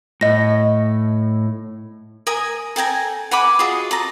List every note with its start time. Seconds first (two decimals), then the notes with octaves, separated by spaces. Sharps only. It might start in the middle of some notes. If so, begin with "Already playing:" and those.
0.21 A2 D#5 A#6
2.27 A#4 G#5 D#6
2.76 A4 G5 G#5 A#5
3.31 F#5 G#5 B5 D6
3.59 F4 F#4 G#4 D#5
3.91 A4 A#5